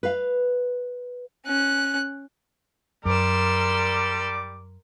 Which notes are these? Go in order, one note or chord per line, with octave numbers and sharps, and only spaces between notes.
B4 F5
C#4 F#6
F#2 G3 A#4 D5 C6 D6 E6